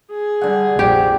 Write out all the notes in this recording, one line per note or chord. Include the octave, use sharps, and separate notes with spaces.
G#4
D3 G3 F#5
A#1 F2 G4